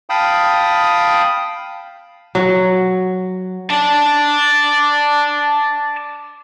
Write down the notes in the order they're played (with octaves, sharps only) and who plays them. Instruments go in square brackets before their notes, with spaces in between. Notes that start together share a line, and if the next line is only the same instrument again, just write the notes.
[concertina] F5 G5 A5 B5 D#6
[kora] F#3
[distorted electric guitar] D5 A5